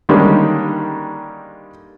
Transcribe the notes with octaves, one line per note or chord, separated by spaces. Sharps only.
D3 D#3 G3 G#3 A#3 C#4